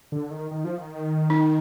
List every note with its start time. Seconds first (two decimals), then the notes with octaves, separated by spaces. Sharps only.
0.12 D3
0.31 D#3
0.51 D#3
0.65 F3
0.78 D#3
1.30 D#4